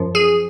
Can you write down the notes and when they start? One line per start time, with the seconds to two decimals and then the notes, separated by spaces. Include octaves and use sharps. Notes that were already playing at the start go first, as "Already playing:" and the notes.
Already playing: F#2 F3
0.15 G#4